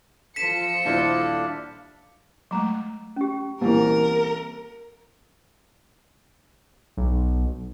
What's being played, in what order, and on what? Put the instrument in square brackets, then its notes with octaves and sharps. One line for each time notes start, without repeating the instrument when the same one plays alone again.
[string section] F3 A4 C#7 [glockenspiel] B6 E7
[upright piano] D#1 E4 C5 [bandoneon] D4 D5 F5
[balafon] F#3 G#3 A3 [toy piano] A#5 D6
[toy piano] C#4 G4
[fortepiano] C2 A#2 E3 [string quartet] A#4
[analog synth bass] B1